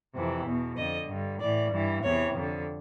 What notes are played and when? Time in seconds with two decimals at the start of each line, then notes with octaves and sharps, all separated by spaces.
0.14 F2 C3 E3
0.46 E2 B2
0.77 F2 D3 D#5
1.09 G2 D3
1.40 A2 E3 D5
1.71 G2 E3
2.03 E2 C3 E3 C#5
2.35 F2 D3